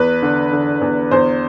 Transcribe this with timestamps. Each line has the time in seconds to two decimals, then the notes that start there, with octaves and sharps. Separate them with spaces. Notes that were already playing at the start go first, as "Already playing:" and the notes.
Already playing: E2 B4
0.22 D3
0.52 D3
0.81 E2
1.11 E2 C5